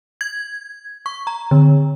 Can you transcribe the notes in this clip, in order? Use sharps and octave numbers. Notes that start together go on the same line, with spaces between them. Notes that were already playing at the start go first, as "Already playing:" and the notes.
G#6
C#6
A#5
D3